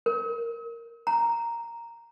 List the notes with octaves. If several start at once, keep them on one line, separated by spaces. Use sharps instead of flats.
A#4
A#5